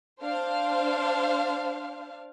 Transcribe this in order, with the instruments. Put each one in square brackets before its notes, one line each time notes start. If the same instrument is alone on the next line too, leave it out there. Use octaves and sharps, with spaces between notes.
[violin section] D4 C5 F5